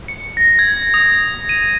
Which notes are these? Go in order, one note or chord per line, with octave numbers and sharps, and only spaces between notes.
C#7
A#6
G#6
D#6
D#7